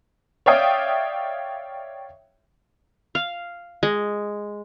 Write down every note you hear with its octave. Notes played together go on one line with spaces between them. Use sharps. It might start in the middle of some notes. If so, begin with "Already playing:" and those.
C#5 D5 E5 F5 G5 D#6
F5
G#3